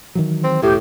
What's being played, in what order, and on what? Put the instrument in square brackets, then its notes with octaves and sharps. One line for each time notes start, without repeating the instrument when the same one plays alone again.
[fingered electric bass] D#3 E3 F#3
[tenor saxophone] C4
[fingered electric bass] E1 [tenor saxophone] A2 [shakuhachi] G4